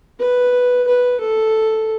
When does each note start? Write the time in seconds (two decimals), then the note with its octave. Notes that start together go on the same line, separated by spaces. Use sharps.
0.20 B4
0.88 B4
1.20 A4